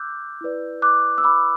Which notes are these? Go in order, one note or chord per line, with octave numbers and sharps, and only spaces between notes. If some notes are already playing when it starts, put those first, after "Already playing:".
Already playing: D6 E6 F#6 G6
E4 B4 D5
D6 F#6
E6
B5 D6